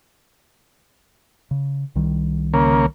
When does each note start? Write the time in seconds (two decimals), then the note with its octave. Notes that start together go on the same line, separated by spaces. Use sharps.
1.51 C#3
1.95 C2 D#3 G3
2.54 C#3 A#3